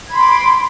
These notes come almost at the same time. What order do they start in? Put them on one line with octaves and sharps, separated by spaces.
G#6 B5 C6 D6